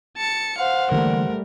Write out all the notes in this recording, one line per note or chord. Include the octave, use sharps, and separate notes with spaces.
A5 C#7
C5 F5 F#5
D3 E3 G3 A3 A#3 A#4